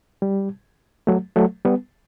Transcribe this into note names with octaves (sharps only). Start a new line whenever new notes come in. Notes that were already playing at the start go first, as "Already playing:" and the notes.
G3
F#3 A3
F#3 A3
G3 B3